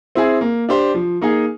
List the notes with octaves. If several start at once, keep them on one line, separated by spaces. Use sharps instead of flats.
C4 E4 G#4
A#3
D4 G4 C5
F3
A#3 D#4 G#4